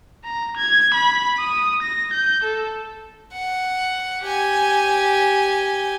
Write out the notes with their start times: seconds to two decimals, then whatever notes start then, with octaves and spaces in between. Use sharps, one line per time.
0.25 A#5
0.57 G#6
0.95 B5
1.39 D#6
1.83 A#6
2.14 G6
2.44 A4
3.33 F#5
4.22 G4 G#5